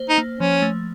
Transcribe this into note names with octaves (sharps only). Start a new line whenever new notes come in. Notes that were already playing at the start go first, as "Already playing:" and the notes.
Already playing: A#3 C5
D#4
A#3
F3 C#4
A3